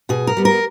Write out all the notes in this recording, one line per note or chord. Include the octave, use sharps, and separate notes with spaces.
B2 G#4
A#4
G3 B3
A#4